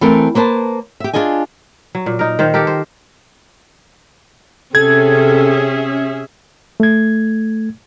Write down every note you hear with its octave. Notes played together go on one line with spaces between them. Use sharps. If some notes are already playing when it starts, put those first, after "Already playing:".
E3 A3 C4 A4 A#4
A#3 B4 C5 F5 A5
G4 E5
D4 E4 F4 G#4 D#5 G#5
F#3
A#2
D#4 A#4
D#3 C5 F5
G4 A4 A#4
C5
C3 C#4 G#4 A4 E5 G#6
A3 G#6